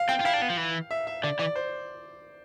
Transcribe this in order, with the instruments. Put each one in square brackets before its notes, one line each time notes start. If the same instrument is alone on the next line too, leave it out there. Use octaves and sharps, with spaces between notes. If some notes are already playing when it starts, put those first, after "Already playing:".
Already playing: [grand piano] F5
[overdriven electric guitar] C4 [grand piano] G5
[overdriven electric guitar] F4
[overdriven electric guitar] E4 [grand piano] F5
[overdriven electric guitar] D4
B3
F3
E3
[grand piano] E5
E5
[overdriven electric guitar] D3 [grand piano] D5
[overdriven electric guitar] E3 [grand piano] D5
[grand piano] C5